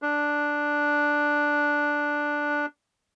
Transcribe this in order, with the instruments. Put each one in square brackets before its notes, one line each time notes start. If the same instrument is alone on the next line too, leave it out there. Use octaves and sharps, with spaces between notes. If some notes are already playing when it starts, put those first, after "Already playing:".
[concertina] D4